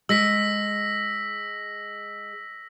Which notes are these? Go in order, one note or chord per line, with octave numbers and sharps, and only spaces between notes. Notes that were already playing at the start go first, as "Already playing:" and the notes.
G#3 E6 A#6 B6